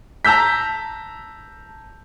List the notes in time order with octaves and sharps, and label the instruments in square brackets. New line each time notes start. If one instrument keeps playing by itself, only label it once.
[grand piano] A5 A#5 E6 G6 B6